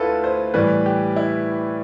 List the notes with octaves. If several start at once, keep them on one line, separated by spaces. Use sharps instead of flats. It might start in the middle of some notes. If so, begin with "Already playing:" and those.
Already playing: D2 E4 F4 A4 B4
C5
A2 E3 G3 B4
G4
E4